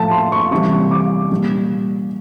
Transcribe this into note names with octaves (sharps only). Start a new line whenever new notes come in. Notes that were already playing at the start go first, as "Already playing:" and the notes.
Already playing: A2 F3 A3 A5
C6
C#6
C3 E3 G3 C#6
D6
A#2 G3